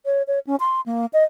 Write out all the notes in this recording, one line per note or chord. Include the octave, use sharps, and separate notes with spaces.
C#5
C#5
C#4
C6
A#3
D#5